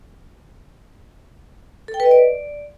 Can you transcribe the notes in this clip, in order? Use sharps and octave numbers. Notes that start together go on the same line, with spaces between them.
A4
G5
B4
D#5
D5